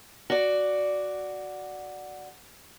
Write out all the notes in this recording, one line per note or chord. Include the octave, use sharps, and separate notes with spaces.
F#4 D5